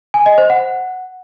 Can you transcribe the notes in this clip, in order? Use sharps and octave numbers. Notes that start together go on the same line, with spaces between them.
G#5
D#5
C5
F#5